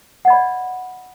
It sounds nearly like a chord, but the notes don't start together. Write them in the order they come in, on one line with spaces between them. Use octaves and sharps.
F#5 D#5 B5 D5